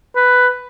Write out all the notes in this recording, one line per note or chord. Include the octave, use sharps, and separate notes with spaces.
B4